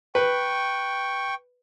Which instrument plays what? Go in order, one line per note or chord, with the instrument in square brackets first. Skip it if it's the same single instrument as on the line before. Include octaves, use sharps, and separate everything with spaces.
[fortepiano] B4 [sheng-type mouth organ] G5 C#6